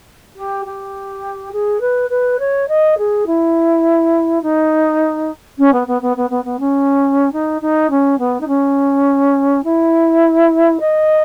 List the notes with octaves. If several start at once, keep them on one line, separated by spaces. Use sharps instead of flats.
G4
G4
G#4
B4
B4
C#5
D#5
G#4
E4
D#4
C#4
B3
B3
B3
B3
B3
B3
C#4
D#4
D#4
C#4
B3
D#4
C#4
E4
D#5